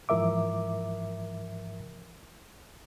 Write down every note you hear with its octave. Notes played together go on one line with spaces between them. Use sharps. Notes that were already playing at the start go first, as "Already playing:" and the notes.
G#2 E3 F3 A#4 E5 D6